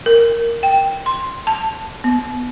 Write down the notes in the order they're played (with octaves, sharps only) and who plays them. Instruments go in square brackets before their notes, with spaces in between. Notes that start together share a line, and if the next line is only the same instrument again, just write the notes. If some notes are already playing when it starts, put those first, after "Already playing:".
[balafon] A#4
G5
C6
A5
B3